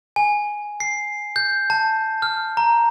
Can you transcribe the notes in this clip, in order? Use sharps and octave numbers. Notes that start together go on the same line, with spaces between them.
G#5
C7
G6
A5
F6
A#5